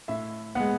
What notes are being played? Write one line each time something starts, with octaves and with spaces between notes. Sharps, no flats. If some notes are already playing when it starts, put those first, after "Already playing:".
A2 E5
G#3 B3 F#5